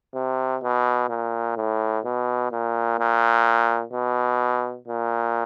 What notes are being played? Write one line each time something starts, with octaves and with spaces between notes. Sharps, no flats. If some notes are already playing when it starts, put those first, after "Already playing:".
C3
B2
A#2
A2
B2
A#2
A#2
B2
A#2